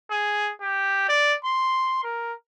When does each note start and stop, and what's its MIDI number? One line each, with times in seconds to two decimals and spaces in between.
0.10 0.51 68
0.61 1.07 67
1.09 1.35 74
1.44 2.01 84
2.04 2.33 70